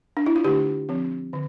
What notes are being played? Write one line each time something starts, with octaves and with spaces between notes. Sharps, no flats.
D4
E4
F4
D3 A3 D4 G4
F3 C4
D3